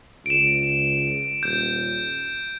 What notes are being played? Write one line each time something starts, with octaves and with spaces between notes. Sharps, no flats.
C#2 D7 E7
D#1 G6